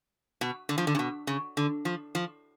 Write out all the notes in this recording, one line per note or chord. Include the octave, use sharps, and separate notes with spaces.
B2
D3
F3
D3
C#3
B2
C#3
D3
F3
F3